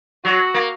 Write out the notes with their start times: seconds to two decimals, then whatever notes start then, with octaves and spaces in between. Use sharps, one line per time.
0.25 F#3 F#4
0.54 A#3